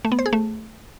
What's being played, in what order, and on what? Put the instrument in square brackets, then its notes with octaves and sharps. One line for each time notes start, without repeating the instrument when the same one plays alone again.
[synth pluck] A3
B3
C5
G#4
A3